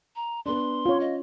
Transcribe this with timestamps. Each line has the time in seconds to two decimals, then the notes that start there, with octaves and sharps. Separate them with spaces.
0.16 A#5
0.46 B3 D4 C6
0.86 C#4 F4 C#5
1.00 D#5